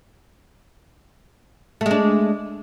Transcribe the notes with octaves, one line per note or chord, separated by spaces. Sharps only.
G#3 A3 D4